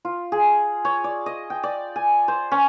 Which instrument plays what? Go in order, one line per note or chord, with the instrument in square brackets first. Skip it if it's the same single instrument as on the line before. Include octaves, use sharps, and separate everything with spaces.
[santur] F4
G#4
C#5
D5
D#5
G5
D5
G#5
C5
C#4